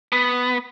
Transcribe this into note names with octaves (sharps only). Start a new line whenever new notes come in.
B3